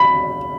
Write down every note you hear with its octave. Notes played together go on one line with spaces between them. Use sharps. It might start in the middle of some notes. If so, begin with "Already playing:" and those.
Already playing: B5